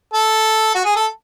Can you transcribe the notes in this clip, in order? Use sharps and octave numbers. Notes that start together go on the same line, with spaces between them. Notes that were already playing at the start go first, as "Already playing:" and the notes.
A4
F#4
G#4
A4